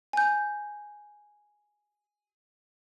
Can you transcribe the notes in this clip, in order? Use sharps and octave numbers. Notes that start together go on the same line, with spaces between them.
G#5 G6